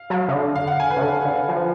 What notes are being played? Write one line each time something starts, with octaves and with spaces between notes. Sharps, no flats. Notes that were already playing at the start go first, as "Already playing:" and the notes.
Already playing: F5
F#3
C#3
D3
F5
F#5
G#5
B4
C#3
D3 A4
D3
F3